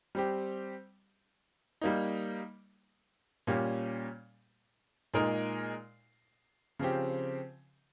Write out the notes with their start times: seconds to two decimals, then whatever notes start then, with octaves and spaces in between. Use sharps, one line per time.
0.15 G3 C4 G4
1.81 G3 A#3 D#4
3.47 A#2 G3 A#3 C#4 G4
5.14 A#2 G#3 D#4 A#4
6.79 C#3 F3 C4 G4